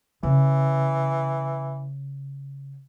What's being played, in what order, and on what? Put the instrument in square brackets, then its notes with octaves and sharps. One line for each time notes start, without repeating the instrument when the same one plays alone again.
[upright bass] C#3 [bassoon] E3